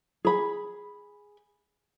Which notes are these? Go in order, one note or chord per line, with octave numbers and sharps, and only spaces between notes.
G#4 B5